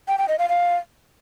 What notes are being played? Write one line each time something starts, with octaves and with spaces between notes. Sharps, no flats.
G5
G5
D#5
F5
F5